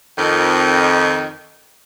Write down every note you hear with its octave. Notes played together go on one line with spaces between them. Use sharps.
F2 D#3